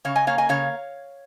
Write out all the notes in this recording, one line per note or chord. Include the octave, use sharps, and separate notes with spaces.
C#3 C#5 F5
D#5 G#5
A#3 C#5 F5
D#5 G#5
C#3 C#5 F5